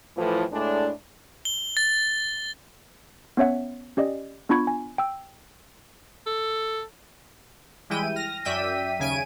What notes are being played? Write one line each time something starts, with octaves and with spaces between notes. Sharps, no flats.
A2 E3 F3
A2 G#3 D4
G7
A6
B3 C#4 C#5 E5 F#5
C#4 G4 D5 D#5
B3 D4 F4 B5 C#6 G#6
G#5
G5 E6
A4
E3 G3 G#3 E4 G5 D#7
F6 A#6
F#2 D5 E5 G5 B6 D#7
D#2 C#3 G#5 D7 D#7